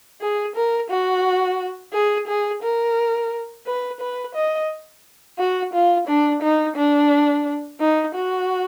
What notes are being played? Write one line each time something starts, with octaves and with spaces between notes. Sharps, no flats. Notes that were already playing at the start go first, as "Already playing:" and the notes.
G#4
A#4
F#4
G#4
G#4
A#4
B4
B4
D#5
F#4
F4
D4
D#4
D4
D#4
F#4